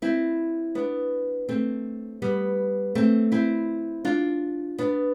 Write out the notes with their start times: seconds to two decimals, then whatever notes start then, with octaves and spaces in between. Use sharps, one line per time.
0.02 C4 E4
0.75 B3 D4
1.49 A3 C4
2.22 G3 B3
2.95 A3 C4
3.32 C4 E4
4.05 D4 F4
4.78 B3 D4